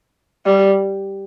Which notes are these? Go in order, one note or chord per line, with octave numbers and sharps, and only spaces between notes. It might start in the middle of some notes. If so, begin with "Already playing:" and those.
G3